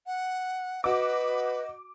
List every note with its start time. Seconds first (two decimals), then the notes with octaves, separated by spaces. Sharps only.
0.06 F#5
0.84 F#4 B4 D#5 D6